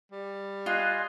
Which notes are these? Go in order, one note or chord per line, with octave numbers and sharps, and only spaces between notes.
G3
F4 D#5 G#5 C6 F#6